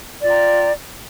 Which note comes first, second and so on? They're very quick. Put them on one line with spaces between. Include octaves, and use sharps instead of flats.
D5 F4 G5 A#5